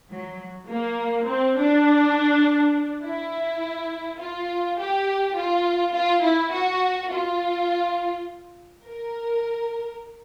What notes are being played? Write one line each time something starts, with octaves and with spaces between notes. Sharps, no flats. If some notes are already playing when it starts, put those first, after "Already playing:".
F#3
A#3
C4
D4
E4
F4
G4
F4
F4
E4
F#4
F4
A#4